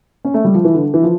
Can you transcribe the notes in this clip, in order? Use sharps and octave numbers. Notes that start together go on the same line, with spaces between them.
C#4
A3
G3
F3
E3
D3
E3
F3